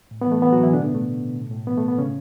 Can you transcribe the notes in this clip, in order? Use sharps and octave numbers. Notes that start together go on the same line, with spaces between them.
A2
B3
E3 A3
E3 B3
F#3 F#4
A2
E3 E4
B2 D3 D4
B3
B2
A3
B2
B2
A2
A2
E3 B3
A3
A2
B3
A2 C#3 C#4